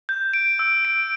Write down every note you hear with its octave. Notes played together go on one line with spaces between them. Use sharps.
G6
D7
E6
D7